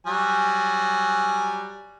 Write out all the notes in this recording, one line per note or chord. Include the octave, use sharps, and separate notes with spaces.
F#3 G3 G#5